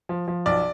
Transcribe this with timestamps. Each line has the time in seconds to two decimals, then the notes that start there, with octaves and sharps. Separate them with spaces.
0.09 F3
0.28 F3
0.46 B1 D5